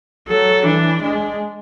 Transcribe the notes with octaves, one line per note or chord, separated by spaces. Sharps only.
F#3 A4
E3 D4
G#3 D4